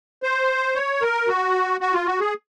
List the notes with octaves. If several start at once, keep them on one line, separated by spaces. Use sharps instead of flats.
C5
C#5
A#4
F#4
F#4
F4
F#4
G#4